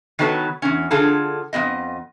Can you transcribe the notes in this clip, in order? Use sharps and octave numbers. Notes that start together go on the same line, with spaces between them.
D#3 F#3 B3 A4 B4 C#5
E2 C#4
D3 F4 G#4 A4
F2 G#2 B3 D#5